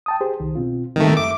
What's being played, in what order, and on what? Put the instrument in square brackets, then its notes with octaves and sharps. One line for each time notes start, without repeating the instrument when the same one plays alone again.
[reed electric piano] G5 A5 D#6
G4 G#4 C5
C2 D#3
B2 C4 F4
[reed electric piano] G#2 G3 C4 [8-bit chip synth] D#3 A3
[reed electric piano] F#2 E5 [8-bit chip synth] D6